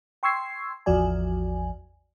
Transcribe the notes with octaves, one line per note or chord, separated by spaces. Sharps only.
G5 C6 C#6 E6 G#6 C7
A1 E2 F3 F#4 D5 G#5